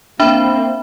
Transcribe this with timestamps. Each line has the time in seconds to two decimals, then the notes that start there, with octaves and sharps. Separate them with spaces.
0.20 A#3 C4 D4 E5 B5